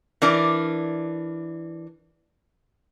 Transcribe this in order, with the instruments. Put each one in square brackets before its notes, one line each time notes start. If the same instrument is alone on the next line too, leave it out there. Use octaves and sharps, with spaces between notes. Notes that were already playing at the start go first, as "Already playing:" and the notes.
[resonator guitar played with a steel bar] E3 D4 A#4 D5